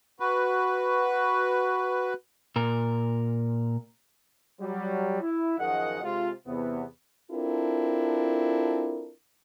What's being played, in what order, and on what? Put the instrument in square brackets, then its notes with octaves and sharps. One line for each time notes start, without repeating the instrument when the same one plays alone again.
[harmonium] F#4 B4
[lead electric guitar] A#2 A#4
[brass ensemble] F#3 G3
E4
F#2 D#3 F3 G#4 D#5 F#5
C3 G#3 F4
E2 C3 B3
[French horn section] C4 D4 E4 F4 A4 A#4